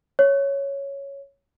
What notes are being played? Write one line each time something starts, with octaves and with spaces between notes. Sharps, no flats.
C#5